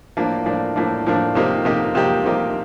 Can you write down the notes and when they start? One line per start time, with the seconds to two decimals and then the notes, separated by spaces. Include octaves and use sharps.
0.17 A2 F3 A#3 D4
0.46 A2 F3 A#3 D4
0.76 A2 F3 A#3 D4
1.06 A2 F3 A#3 D4
1.35 C3 F3 A#3 D#4 G4
1.65 C3 F3 A#3 D#4 G4
1.95 C3 F3 A#3 D#4 G4
2.25 C3 F3 A#3 D#4 G4